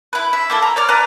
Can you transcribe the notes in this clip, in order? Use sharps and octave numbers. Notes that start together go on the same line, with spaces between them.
E4 B4
E5
A#3 E4 A4
A#5
C#5 D5 F6
B4 D5 G#5 A#5